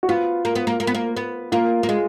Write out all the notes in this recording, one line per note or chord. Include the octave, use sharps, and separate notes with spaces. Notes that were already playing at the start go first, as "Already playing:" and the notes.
F#4
B3 F4
A#3
B3
A#3
A#3
B3
A#3
B3
A#3 F4
A#3
G#3